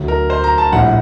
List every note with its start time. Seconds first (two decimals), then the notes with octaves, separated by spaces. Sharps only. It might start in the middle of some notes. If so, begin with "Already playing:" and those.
Already playing: D2 D3 F#3
0.08 A#4
0.30 C5
0.44 A#5
0.58 A5
0.72 A#1 A2 G3 F#5